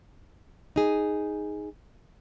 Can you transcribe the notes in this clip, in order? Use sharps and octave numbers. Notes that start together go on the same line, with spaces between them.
D#4 G#4